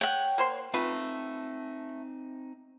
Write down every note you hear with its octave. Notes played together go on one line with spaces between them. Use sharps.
C#5 F#5 G5
A#3 C5 C6
A3 C4 D#4 F4 B4